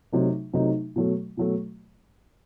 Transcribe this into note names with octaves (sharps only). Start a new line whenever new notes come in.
C3 F#3 A3 D#4
C3 F#3 A3 D#4
B2 F#3 A3
B2 F#3 A3